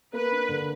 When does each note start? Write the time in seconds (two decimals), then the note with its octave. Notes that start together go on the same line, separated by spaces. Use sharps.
0.13 A#3 B4
0.32 D4
0.49 D3